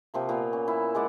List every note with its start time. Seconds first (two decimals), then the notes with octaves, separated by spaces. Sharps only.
0.14 C3 F3 A#3
0.29 A#2 A#3 B3
0.53 C#4
0.68 E4
0.95 G#3 D5 F#5 D6